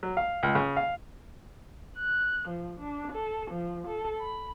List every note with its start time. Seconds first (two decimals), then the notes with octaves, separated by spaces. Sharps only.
0.03 F#3
0.17 F5
0.43 C#2
0.55 C#3
0.77 F5
1.98 F#6
2.49 F3
2.79 D4
3.12 A4
3.51 F3
3.87 A4
4.21 B5